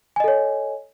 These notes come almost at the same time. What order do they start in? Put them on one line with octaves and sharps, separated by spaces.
G#5 D#5 A4 C#5